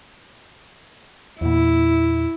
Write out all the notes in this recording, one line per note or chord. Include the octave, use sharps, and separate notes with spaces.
E2 A#2 E4